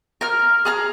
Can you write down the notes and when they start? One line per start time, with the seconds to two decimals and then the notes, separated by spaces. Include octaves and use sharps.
0.21 A#4 F6
0.65 G#4 A#5 F6